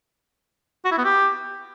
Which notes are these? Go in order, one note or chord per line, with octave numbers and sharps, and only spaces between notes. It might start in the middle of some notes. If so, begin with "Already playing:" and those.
F#4
E4
B3
G4